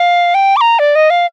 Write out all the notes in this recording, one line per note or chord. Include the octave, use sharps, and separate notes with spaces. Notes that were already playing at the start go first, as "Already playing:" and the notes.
Already playing: F5
G5
D6
A#5
D5
D#5
F5